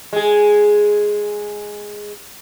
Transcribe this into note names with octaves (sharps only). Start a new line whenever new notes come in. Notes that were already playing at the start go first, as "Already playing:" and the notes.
G#3 G#4